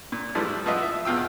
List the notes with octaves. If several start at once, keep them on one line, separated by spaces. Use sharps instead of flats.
A#2
G#2 E3 F3 G3 A3
F3 B3 F4 D#5 E5
E5
E2 B2 F4 G5 E6